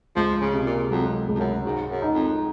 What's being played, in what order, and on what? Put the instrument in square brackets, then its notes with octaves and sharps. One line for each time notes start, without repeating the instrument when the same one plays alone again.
[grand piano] C#2 [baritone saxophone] F3
[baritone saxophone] C#3
[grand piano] C3
[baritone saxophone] A#2
[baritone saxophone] F2 [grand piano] F#3
[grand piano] C#2
[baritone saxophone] F2
F#2
[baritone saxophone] G#2 [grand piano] F#4
[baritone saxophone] F#2
[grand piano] D#4
[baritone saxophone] F2